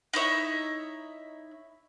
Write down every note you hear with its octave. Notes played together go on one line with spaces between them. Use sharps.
D#4 E4 C#5 E5